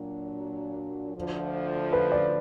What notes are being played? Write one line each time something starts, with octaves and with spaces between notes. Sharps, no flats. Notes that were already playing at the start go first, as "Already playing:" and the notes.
Already playing: A#2 F#3 D4
D2 D3 F3
B4
D5